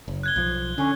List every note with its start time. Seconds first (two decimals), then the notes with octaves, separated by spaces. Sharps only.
0.08 F#1
0.23 F#6 G#6 G7
0.36 B1 F3
0.78 D3 C#4